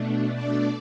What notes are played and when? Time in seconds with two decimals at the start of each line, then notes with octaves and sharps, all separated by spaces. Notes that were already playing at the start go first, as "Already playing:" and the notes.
Already playing: B2 A3 D4
0.33 D5